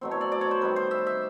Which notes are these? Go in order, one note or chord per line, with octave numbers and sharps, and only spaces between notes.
B2 F#3 A3 C4
C#5
D5
D5
C#5
C5
D#3 G3 C4 B4
C5
E5
E5